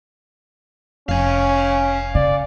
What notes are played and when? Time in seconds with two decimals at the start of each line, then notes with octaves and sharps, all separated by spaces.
1.09 F1 C#4 F5 G#5
2.15 C#3 D5